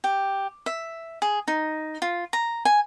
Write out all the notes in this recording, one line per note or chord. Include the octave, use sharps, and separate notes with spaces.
G4
E5
G#4
D#4
F4
A#5
G#5